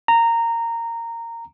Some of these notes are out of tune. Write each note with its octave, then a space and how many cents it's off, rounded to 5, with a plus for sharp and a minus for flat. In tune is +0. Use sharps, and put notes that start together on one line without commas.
A#5 -15